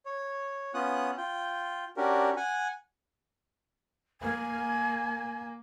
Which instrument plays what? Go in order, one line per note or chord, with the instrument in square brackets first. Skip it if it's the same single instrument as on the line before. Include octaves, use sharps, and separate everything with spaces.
[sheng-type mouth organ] C#5
B3 C#4 F4 D#6 F#6
F4 G5
C#4 D4 F#4 G4 A#4
F#5 G#5
[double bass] A#3 [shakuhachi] G#5